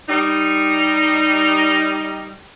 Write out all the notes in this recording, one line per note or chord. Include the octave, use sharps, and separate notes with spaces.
G3 D#4